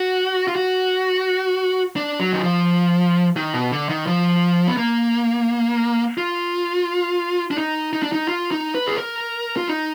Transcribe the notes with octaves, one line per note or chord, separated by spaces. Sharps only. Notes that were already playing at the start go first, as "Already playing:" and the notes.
Already playing: F#4
F4
F#4
D4
F#3
D#3
F3
D#3
B2
D3
D#3
F3
B3
A#3
F4
D4
D#4
D#4
D4
D#4
F4
D#4
B4
G#4
A#4
F4
D#4